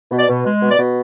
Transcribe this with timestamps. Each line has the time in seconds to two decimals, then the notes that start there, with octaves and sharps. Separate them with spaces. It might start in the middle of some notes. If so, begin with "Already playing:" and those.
0.11 B2
0.19 D5
0.28 B2
0.45 G#3
0.62 B2
0.70 D5
0.79 B2